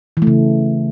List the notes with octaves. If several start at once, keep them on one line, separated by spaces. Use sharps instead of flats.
E3
A3
C#3